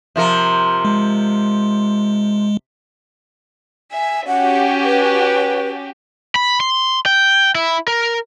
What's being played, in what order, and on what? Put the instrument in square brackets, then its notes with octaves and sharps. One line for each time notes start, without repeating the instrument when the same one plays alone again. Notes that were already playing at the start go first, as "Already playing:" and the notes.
[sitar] C3 F3 A#4
[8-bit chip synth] G#3
[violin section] E5 [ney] G#5
[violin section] C#4 F#4 G4 [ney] F#5
[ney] B4
[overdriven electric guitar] B5
C6
G5
E4
A#4